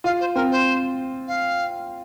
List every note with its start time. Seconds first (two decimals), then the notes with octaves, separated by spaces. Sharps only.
0.04 F4 F5
0.20 C5
0.35 C4 A#4
0.51 C5
1.28 F5